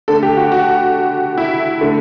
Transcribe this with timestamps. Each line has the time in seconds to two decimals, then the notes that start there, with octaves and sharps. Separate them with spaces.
0.08 D3 A3 A4
0.23 G4
0.37 F#4
0.52 F#4
1.38 E4
1.81 D3 A3